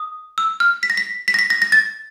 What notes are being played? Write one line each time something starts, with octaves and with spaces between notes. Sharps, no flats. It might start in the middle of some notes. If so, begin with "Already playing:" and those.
Already playing: D#6
E6
F6
B6
A#6
B6
B6
A#6
B6
A#6
A#6
A6